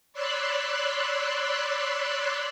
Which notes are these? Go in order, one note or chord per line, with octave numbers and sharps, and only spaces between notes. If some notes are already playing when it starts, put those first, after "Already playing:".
C#5 D5 B5 C6 E6 F#6